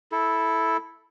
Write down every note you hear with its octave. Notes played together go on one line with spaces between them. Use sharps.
E4 A4